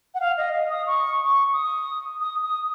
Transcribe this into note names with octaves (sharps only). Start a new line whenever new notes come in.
F#5
F5
D#5
F5
D#6
C#6
C#6
D#6
D#6
D#6